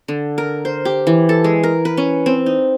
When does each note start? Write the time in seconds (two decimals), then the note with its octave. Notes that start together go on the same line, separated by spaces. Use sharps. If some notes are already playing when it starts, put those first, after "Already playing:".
0.08 D3
0.38 A#4
0.65 C5
0.85 G4
1.07 E3
1.29 A4
1.44 G#3
1.63 A#4
1.85 B4
1.97 C#4
2.26 C4
2.46 D#4